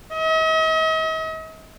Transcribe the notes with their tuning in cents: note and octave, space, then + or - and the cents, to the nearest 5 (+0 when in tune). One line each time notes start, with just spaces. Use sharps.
D#5 +45